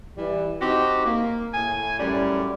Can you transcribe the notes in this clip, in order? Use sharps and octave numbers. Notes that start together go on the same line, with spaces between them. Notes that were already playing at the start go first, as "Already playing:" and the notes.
E3 G3
C4 D#4 F#4 G4
A#3
A2 G#5
F#2 A2 G3